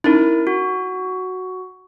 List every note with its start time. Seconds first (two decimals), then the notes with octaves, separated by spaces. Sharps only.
0.04 C#4 D#4 E4 A#4
0.47 F#4